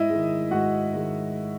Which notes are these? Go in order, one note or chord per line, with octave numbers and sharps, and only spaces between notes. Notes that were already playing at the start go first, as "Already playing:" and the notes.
Already playing: G#2 E4 D#5 E5
D#3 G#3
G#2 F#4 F#5
D#3 G#3